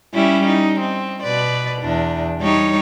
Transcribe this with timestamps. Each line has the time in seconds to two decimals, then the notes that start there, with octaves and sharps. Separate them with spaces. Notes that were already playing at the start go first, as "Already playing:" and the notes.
0.14 G3 C#4 E4
0.47 D#4
0.80 C4
1.23 B2 B4 D5
1.82 E2 D4
2.40 G3 D#4 C#5